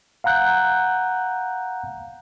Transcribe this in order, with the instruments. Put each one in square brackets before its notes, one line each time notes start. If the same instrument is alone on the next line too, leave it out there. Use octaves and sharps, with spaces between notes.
[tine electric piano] F5 F#5 A#5 F#6 G6